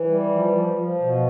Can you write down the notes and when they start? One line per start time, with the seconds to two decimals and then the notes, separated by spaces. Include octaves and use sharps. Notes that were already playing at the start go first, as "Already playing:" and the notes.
Already playing: E3
0.08 G3
0.31 F3
0.54 F3
0.77 F3
1.00 B2